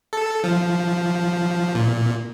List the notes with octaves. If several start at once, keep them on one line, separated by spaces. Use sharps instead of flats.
A4
F3
A#2